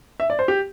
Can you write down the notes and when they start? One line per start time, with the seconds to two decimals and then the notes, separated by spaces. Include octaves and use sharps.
0.20 E5
0.30 D5
0.39 C5
0.48 G4